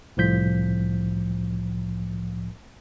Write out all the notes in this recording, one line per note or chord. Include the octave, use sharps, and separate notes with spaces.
C2 A2 F3 G6 B6